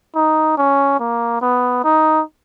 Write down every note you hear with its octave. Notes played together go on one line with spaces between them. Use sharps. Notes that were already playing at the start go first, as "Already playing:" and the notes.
D#4
C#4
A#3
B3
D#4